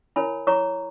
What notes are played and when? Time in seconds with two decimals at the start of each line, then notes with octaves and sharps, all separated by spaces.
0.16 E4 A#4 C#5 G#5 B5
0.47 E4 G#4 C#5 A#5 C#6